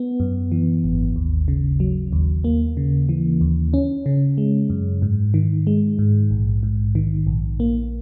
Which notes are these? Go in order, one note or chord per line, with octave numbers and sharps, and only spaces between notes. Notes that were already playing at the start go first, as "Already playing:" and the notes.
Already playing: B3
F#2
E3
G#1
D#2
C#3
F#3
D#2
A#3
C#3
E3
D#2
C#4
C#3
G#3
F#2
G#2
D#3
G#3
G#2
A#1
G#2
D#3
A#1
A#3